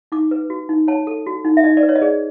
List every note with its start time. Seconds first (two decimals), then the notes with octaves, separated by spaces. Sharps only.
0.12 D#4 D6
0.31 B4
0.50 F#4
0.69 D#4
0.88 C#5 A5
1.07 A4
1.27 F#4
1.45 D#4
1.57 E5
1.64 D#4 D#5
1.77 D5
1.83 B4
1.89 C#5
1.96 D#5
2.02 G#4 D5